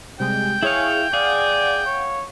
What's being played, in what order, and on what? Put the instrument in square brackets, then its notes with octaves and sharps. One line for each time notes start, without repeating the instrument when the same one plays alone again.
[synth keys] C3 G3 G#3 [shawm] G5
[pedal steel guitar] E4 F5 [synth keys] G#4 C#5 C#6
[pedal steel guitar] G#4 [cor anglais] D5 [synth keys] F5 F#5
[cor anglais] C#5